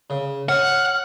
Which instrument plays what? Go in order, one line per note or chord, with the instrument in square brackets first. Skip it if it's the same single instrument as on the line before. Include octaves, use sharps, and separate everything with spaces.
[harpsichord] C#3
[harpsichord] C#5 [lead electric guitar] F#5 [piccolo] F6